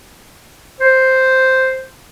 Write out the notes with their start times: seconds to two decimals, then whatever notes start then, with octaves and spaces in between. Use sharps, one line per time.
0.80 C5